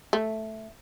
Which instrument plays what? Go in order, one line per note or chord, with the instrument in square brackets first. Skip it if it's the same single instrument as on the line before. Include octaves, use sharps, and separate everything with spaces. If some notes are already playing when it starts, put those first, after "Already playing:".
[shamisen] A3